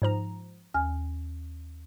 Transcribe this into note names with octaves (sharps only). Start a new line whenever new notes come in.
G#2 F3 A#5
D#2 G#5 F6